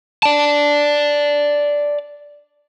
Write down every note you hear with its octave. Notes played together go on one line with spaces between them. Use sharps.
D5 A5